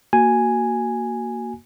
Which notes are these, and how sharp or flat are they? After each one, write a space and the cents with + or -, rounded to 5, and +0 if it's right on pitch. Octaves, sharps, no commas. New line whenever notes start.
A#3 +0 F#4 +0 G#5 +0